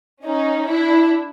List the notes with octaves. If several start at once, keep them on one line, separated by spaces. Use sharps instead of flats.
C#4 D#4
D4 E4